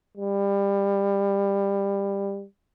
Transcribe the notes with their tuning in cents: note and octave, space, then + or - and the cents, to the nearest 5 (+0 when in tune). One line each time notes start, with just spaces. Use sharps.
G3 +20